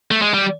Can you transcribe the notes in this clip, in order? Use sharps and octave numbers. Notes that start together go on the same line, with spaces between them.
A3
G#3
G3